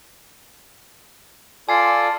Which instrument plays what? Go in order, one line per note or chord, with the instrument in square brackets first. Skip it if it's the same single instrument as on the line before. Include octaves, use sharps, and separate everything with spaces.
[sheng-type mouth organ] F4 A4 D5 [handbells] G#5 C7